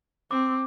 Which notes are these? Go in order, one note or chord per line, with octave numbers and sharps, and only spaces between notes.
C4 D6
D6